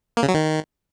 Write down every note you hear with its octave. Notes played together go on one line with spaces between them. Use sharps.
A#3
C#3
F#3
D#3